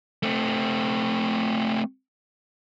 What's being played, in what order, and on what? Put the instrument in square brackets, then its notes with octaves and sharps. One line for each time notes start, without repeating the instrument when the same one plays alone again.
[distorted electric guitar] A3 C4